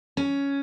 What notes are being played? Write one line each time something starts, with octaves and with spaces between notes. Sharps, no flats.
C#4